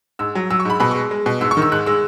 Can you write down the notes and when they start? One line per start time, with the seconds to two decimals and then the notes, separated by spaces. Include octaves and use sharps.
0.19 G#2 E6
0.35 F#3
0.50 F#3 E6
0.60 C#6
0.65 G#2 B5
0.80 B2 B5
0.91 C#6
0.95 G#3
1.11 G#3
1.26 B2
1.41 G#2 E6
1.51 C#6
1.57 D#3
1.62 E6
1.72 G#2 F#6
1.86 G#3 E6